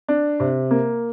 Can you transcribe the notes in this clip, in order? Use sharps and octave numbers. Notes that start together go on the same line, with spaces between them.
D4
C3
A#3